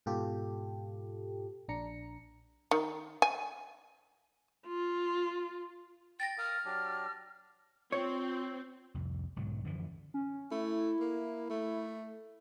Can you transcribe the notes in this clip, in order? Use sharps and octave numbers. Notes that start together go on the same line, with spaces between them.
G#2 B2 F4 G4 A4
A#1 D4 A#5 C#7
D#3
G#5
F4
G5 A6 A#6
A#4 F5 D#6 F6
F#3 D4 G4
C4 F4 C#5
C2 F2
B1 G#2 D3 F#3
F#2 D3 E3 F3
C#4
A3 E4
A#3
A3